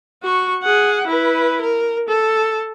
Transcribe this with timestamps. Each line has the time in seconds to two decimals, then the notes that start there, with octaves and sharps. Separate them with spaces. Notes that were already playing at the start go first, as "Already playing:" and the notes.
0.23 F#4 C#6
0.63 G#4 F#5
1.07 E4 B4
1.61 A#4
2.09 A4